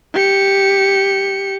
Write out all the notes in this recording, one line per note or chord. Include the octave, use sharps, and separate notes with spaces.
G4 C#7